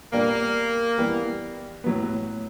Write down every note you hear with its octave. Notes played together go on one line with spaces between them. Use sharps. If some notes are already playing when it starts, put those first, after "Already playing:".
A#2 G3 A#3 B3 D4
E3 G3 B3
A2 F#3 B3